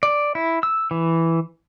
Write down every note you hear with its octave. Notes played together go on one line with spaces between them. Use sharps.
D5
E4
E6
E3